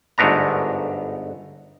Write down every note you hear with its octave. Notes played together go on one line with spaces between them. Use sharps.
G1 G#2 A3 B3 D4 A#5